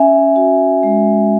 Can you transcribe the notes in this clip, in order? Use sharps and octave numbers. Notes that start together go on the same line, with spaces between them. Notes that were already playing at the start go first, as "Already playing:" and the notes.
Already playing: C#4 E5 G#5
F#4
G#3